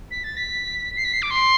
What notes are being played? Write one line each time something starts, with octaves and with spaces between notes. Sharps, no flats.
B6
A6
B6
C7
B6
C7
D6
C6